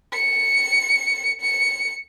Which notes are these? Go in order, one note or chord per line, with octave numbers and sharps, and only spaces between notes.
C#7
C#7